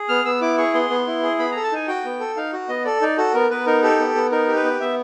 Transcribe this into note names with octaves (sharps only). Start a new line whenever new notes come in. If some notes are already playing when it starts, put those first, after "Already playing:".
Already playing: G#4
B3 F6
B3 E6
E4 D6
G#4 C#6
B3 C6
B3
E4
G#4
B3 B5
A4 A#5
A5
D#4 G#5
F#4 G5
B3
A4
D#4 F5
F#4
B3 D#5
A4 D5
D#4 D5
F#4 A4
B3 A#4
B3 B4
D#4 A#4
G4 A4
B3
B3
D#4 A#4
G4
B4
B3
B3 E5